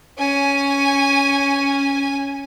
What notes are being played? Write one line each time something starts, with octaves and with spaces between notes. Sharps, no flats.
C#4 G#5